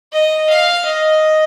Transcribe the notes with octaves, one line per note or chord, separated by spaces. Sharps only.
D#5
F5
D#5